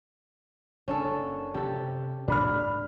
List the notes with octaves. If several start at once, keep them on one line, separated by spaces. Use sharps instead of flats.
F#1 C#4 D4 A4
C3 C#4 G4 A4
G#2 D4 B5 F6